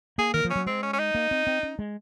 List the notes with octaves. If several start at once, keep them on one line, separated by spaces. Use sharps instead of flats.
A#3 G#4
D#3 A#4
F3
F#3 C#4
G#3 C4
C#4
C#4
D#4
A#3
C4
C4
C#4
G#3